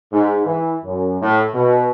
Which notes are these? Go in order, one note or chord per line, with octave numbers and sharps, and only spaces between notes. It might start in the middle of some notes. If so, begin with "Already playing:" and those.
G#2
E3
F#2
A2
B2